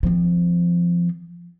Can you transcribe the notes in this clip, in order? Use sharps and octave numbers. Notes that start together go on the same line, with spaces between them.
F3 C4